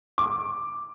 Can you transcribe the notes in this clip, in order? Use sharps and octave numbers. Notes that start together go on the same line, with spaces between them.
D6